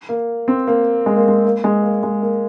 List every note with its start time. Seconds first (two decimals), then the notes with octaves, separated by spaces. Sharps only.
0.09 A#3
0.48 C4
0.67 A#3
1.06 G#3
1.17 A#3
1.28 G#3
1.45 A#3
1.64 G#3
1.83 A#3
2.03 G#3
2.22 A#3